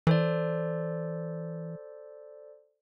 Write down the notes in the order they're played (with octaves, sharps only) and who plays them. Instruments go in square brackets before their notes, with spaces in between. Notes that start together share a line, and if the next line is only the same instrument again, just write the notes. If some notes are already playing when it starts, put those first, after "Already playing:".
[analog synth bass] E3 [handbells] A4 C5 D5